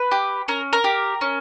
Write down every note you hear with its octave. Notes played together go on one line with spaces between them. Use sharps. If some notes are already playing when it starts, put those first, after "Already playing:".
Already playing: B4
G4
C#4 A#4
A#4
G4
C#4